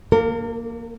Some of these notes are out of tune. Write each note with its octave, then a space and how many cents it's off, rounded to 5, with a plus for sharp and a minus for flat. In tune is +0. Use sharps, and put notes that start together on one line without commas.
A#3 +0 A#4 -45